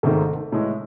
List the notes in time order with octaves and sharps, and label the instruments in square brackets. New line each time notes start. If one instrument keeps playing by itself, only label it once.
[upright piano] G#1 G#2 D#3 A3 C4 [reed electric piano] A4
[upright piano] A2 E3 G#3